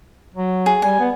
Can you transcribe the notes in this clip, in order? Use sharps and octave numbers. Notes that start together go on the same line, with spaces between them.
F#3
G#4
G3 G#5
B3